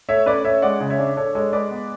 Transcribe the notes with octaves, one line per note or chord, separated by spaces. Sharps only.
A3 C#5 E5
C#4 B4 D5
C#4 C#5 E5
G#3 D5 F#5
C#3
C#5 E5
D4
D4 A4 C#5
G#3 A4 C#5
G#3 B4 D5
B3